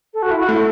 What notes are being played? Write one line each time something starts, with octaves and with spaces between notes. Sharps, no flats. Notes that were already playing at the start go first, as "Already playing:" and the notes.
A4
F#4
E4
F#4
A3 E4